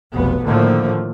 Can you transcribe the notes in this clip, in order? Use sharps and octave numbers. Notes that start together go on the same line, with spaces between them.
F1 B1 B3
A2 D3 D#3 F3 A3 A#3